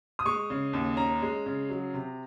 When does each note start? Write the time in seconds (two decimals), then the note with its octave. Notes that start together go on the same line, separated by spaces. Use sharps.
0.19 D#6
0.25 G#3 C#6
0.50 C#3
0.73 D#2
0.97 C#4 A#5
1.22 G#3
1.46 C#3
1.69 F#3
1.94 C3